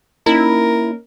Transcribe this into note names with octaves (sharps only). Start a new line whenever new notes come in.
A#3 C#4 D#4 E4 A#4